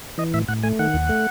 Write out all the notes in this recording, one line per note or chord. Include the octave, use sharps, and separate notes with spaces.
E3 D#5
A2 E5
A2 F#5
A3 G#5
D#3 F#5
D#2
A3